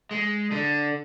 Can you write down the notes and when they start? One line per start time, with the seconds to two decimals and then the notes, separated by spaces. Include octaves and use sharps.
0.11 G#3
0.51 D3